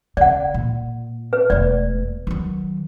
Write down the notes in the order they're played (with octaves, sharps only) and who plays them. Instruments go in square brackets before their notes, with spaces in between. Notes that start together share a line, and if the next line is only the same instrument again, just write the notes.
[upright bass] C#3 [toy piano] D5 F#5
[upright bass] A#2
[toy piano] B4
[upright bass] E1 A3 [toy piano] D5
[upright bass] D#3 F#3